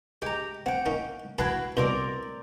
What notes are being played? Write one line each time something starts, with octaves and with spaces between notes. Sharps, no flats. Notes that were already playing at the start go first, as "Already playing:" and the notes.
G#3 G4 A#5
C4 F#5 G5
A#3 C#4 D#4
E4 F#4 B4 G5 A5 C6
C2 B2 C4 A#4 D5